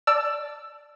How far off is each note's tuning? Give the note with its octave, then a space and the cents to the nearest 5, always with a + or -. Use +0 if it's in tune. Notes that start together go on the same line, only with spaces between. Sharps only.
D5 +0 A5 +0 E6 +20